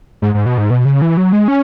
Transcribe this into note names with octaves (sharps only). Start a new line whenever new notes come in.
G#2
G#2
B2
G#2
B2
C#3
E3
F#3
G#3
C#4